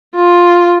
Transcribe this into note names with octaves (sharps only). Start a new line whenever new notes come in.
F4